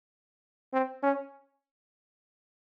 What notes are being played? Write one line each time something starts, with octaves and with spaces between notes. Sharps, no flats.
C4
C#4